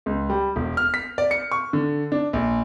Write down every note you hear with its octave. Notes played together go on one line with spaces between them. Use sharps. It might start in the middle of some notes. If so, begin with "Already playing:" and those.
C#2
G3
E1
F6
B6
D5
C#7
C#6
D3
D4
A#1